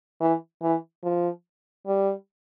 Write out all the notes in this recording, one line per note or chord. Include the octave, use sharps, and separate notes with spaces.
E3
E3
F3
G3